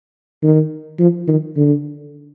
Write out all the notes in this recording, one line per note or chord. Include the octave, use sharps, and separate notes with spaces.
D#3
F3
D#3
D3